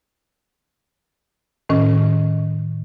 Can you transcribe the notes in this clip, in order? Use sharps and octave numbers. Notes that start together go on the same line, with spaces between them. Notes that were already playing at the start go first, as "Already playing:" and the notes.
A2 D#3 C#4